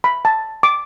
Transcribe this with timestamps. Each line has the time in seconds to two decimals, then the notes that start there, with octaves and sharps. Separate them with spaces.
0.04 B5
0.25 A5
0.63 D6